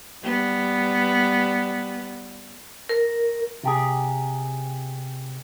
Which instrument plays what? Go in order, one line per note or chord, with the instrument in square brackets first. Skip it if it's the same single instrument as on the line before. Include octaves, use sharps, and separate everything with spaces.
[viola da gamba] G3 B3
[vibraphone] A#4
[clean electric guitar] C3 G4 G#4